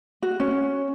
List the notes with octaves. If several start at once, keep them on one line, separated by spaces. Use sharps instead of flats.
F#4
C#4